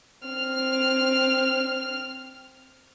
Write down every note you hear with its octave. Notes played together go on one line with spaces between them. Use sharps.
C4 F6